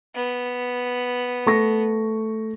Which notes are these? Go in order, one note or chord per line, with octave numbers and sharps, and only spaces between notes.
B3
A3 C#6 A#6